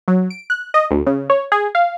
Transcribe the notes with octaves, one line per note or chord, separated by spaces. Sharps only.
F#3
D7
F#6
D#5
D2
C#3
C#5
G#4
F5